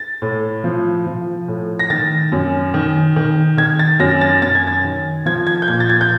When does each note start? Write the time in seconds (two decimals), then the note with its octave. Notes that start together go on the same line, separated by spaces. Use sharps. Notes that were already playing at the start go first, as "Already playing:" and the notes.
Already playing: A6
0.22 A2
0.64 F3
1.06 F3
1.48 A2
1.79 A#6
1.90 D#3 A6
2.32 F#2
2.74 D#3
3.16 D#3
3.57 D#3 G#6
3.79 A6
4.00 F#2 A#6
4.21 A6
4.42 F#2 A6
4.55 G#6
4.67 A6
4.84 D#3
5.26 F3 G#6
5.47 G#6
5.62 G6
5.68 A#2 G#6
5.80 A6
5.90 G#6
6.01 G6